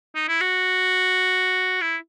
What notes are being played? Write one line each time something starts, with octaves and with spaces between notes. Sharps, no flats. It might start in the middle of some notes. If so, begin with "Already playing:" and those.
D#4
E4
F#4
E4